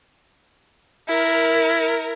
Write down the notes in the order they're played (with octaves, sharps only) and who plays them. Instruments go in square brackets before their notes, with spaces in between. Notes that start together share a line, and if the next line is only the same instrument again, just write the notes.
[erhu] E4 [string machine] A#4